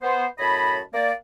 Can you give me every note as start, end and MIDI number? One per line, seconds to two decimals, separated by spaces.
0.02 0.26 59
0.02 0.26 72
0.39 0.79 42
0.39 0.79 45
0.39 0.79 73
0.39 0.79 75
0.39 0.79 81
0.39 0.79 83
0.94 1.12 58
0.94 1.12 74